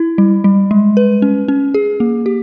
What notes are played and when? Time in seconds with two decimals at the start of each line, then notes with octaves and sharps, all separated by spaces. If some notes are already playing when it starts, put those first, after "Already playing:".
Already playing: E4
0.18 G3
0.44 G3
0.71 G#3
0.97 B4
1.22 C#4
1.48 C#4
1.74 G#4
2.00 A#3
2.26 G4